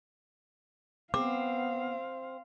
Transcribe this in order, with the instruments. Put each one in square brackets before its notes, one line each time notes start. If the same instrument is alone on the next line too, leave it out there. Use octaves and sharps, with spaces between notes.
[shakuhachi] B3 [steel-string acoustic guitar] C4 [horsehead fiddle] F5 [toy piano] D6